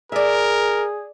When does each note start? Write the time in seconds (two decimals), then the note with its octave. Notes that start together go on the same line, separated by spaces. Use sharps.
0.12 G#4 A#4 D5 E5